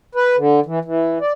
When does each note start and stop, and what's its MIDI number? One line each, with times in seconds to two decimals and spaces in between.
0.15 0.36 71
0.37 0.60 50
0.66 0.79 52
0.85 1.18 52
1.21 1.32 74